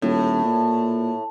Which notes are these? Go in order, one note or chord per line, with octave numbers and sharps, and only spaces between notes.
D#1 A2
A#2